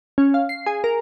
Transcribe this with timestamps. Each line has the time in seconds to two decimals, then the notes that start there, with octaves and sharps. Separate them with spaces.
0.18 C#4
0.34 F5
0.49 C7
0.66 G#4
0.84 A#4